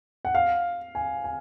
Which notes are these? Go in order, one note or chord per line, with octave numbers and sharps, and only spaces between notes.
F#5
F5
G#5
G#5